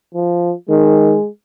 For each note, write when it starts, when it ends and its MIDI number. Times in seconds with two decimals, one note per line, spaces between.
0.14 0.53 53
0.69 1.15 51
0.69 1.28 56